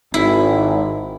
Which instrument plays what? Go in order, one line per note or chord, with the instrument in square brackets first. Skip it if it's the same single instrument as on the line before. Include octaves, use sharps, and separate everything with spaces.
[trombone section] G#1 [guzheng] E4